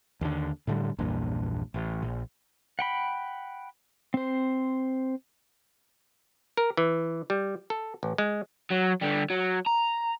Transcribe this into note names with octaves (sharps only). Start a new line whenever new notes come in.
D#2 D3
A2 D3 G3
A#1 E2 G2 A#2
A1
A#1
F#5 G5 B5
C4 C5
A#4
E3
G3
A4
A1
G#3
F#3
D3 G3
F#3
A#5